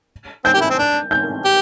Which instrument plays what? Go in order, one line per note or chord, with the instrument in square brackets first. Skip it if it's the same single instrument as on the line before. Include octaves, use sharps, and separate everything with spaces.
[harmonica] C4 [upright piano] G6
[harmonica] G4
E4
C4
D4
[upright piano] G6
[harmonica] G4